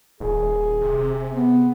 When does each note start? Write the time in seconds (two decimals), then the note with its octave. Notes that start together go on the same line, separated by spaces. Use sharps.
0.20 D#1 G#4
0.81 C3
1.34 B3